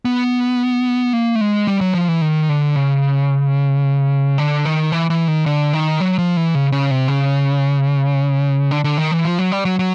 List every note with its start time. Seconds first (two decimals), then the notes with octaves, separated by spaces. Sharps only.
0.05 B3
1.13 A#3
1.35 A3
1.41 G#3
1.67 G3
1.81 F#3
1.94 F3
2.08 E3
2.21 D#3
2.49 D3
2.76 C#3
4.38 D3
4.65 D#3
4.92 E3
5.10 E3
5.28 D#3
5.46 D3
5.73 D#3
6.00 F#3
6.18 F3
6.37 E3
6.55 C#3
6.72 C#3
6.91 C3
7.08 C#3
8.71 D3
8.84 D3
8.98 D#3
9.12 E3
9.25 F3
9.39 F#3
9.52 G3
9.65 F#3
9.79 F#3